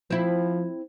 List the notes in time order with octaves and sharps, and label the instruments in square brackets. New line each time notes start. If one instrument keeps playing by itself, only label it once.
[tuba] F3 [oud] C4 E4